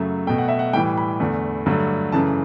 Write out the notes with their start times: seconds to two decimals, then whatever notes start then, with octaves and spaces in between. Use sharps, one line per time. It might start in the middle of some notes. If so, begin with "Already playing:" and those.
Already playing: F#2 C#3 F#3 A3 E5
0.27 B2 A3 G5
0.38 F#5
0.48 E5
0.59 F#5
0.73 A2 E3 G3 G5
0.97 B5
1.20 E2 D3 A3
1.66 G2 D3 F#3 A3
2.12 F#2 C#3 E3 A3 A5